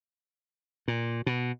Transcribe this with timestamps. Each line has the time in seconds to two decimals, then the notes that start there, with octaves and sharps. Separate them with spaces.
0.88 A#2
1.26 B2